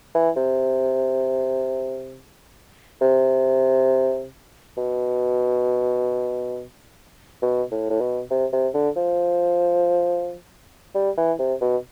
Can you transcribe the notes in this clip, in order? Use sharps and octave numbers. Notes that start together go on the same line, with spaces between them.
E3
C3
C3
B2
B2
A2
A2
B2
C3
C3
D3
F3
G3
E3
C3
B2